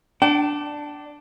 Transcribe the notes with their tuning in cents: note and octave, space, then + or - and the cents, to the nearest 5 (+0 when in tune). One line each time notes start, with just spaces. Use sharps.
D4 +0 G5 -40